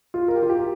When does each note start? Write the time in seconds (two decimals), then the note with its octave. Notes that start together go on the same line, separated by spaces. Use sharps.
0.14 F4
0.28 A#4
0.36 G4
0.43 F4
0.50 G4